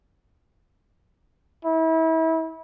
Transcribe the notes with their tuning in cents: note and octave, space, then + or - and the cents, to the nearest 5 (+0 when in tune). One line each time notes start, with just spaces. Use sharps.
E4 -30